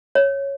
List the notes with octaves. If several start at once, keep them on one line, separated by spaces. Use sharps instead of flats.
C#5